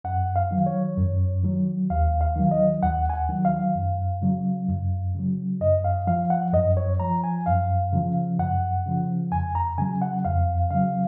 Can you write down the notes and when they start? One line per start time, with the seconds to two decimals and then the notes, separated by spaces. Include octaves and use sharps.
0.04 F#2 F#5
0.36 F5
0.51 D#3 F#3
0.66 C#5
0.97 F#2
1.43 D#3 F#3
1.90 D#2 F5
2.21 F5
2.36 D#3 F#3
2.51 D#5
2.82 D#2 F#5
3.10 G#5
3.13 F#5
3.29 D#3 F#3
3.45 F5
3.75 F#2
4.22 C#3 F#3
4.69 F#2
5.15 C#3 F#3
5.61 F#2 D#5
5.84 F5
6.07 F3 F5
6.30 F#5
6.53 F#2 D#5
6.77 C#5
7.00 F3 A#5
7.24 G#5
7.46 F#2 F5
7.93 C#3 F3
8.39 F#2 F#5
8.86 C#3 F3
9.32 F2 G#5
9.55 A#5
9.78 C#3 F#3 G#5
10.02 F#5
10.25 F2 F5
10.71 C#3 F#3 F5